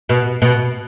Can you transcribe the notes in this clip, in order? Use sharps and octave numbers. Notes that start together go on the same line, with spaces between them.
B2
B2